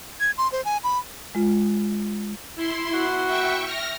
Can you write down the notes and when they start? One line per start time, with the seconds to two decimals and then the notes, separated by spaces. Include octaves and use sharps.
0.20 G#6
0.38 C6
0.52 C5
0.65 G#5
0.84 B5
1.35 G#3 F4
2.55 E4 C6
2.93 B3 F#4
3.27 E5 G5 C#6
3.64 F6 A#6